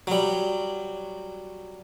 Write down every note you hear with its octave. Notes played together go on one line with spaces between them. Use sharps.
F#3 G3